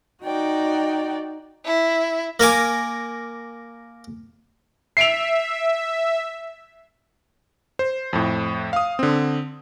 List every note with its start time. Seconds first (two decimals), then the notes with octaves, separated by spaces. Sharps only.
0.24 D#4 F#4 D5 G5
1.65 E4
2.40 A#3 A#4 G#5 D6
4.97 E5 C7 D7 F7
7.79 C5
8.13 F2 A2
8.73 F5 D#6
8.99 D3 C4